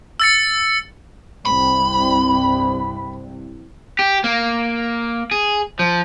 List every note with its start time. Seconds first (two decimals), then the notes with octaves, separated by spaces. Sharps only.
0.20 E6 A6 C#7
1.46 C2 G2 B5
3.99 G4
4.24 A#3
5.31 G#4
5.79 F3